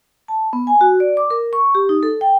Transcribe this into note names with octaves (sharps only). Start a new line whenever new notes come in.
A5
B3
G#5
F#4
D5
D6
A#4
C#6
G4
D#4
A4
G5